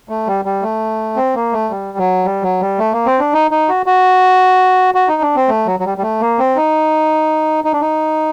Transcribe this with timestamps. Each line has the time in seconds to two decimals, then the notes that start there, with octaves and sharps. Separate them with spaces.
0.09 A3
0.27 G3
0.45 G3
0.62 A3
1.16 C4
1.35 A#3
1.53 A3
1.70 G3
1.98 F#3
2.25 G3
2.42 F#3
2.61 G3
2.79 A3
2.93 A#3
3.06 C4
3.19 D4
3.33 D#4
3.51 D#4
3.69 F#4
3.86 F#4
4.94 F#4
5.08 D#4
5.22 D4
5.36 C4
5.48 A3
5.66 F#3
5.80 F#3
5.85 G3
5.98 G3
6.02 A3
6.21 A#3
6.39 C4
6.56 D#4
7.64 D#4
7.73 D4
7.81 D#4